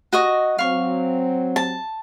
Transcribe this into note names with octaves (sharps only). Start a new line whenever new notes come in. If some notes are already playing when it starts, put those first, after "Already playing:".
F#4 D#5 C#6
F#3 C4 F5 C#6
A5